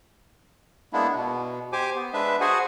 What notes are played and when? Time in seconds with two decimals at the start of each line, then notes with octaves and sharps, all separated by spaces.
0.93 G#3 A#3 B3 D4 E4
1.16 B2
1.73 G4 C5 G#5 D6
1.95 B3
2.14 G#3 D4 B4 E5
2.41 F#4 G#4 C5 F#5 G#5